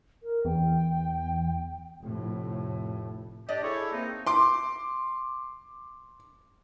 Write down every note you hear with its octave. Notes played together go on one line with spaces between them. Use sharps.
A#4
E2 G5
F1 A2
D4 G4 D5 D#5
E4 G#4 A4 C#5
A#3 C4 D#4
C6 D6